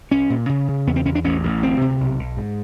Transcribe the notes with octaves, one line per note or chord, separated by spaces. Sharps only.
C2 C#4
A#2
C#3
C#3
E2 B3
C4
E2 C#4
D4
A1 C#4
A1
D2 C4
C3
B1
B1
G#2